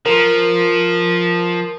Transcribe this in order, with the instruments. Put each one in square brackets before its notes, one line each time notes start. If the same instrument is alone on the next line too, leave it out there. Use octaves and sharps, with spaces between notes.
[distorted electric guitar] F3 [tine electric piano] A#4